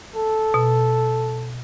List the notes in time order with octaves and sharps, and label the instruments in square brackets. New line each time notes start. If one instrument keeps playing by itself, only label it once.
[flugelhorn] A4
[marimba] B2